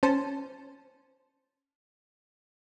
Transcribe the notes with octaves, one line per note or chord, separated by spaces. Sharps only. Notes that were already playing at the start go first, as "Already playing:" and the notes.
C#4 C5 A5